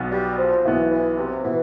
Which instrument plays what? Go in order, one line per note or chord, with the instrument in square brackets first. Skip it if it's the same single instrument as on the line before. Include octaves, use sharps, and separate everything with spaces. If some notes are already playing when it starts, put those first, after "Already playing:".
Already playing: [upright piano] B1 B2 B3
[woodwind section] G3
F3
[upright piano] B1 B2 B3 [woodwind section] E3
[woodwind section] E3
C3
[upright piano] B2 B3 [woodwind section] E3